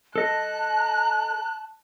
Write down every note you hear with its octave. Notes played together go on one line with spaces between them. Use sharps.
A4 D#5 A5 F#6